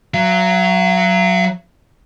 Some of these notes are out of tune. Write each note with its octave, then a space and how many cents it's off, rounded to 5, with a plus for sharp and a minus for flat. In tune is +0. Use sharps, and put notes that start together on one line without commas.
F#3 +0 F5 -45